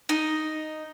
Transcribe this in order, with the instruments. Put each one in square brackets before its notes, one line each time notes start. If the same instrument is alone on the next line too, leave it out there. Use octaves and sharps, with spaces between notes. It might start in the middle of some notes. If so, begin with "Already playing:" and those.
[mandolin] D#4